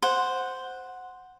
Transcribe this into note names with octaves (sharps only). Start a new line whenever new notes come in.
C5 F#5